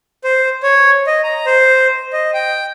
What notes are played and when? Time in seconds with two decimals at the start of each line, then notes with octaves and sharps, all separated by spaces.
0.24 C5
0.63 C#5
1.07 D#5
1.24 A#5
1.46 C5
2.13 D#5
2.34 G5